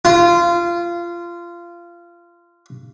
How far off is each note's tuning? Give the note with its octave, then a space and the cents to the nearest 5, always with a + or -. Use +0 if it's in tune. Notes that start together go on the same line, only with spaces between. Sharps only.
F4 -20